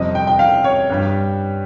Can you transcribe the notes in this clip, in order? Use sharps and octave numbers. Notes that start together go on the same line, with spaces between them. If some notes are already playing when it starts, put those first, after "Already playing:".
Already playing: F2 C3 G3 D#5
G5
G5
F5
C#5
G2 G3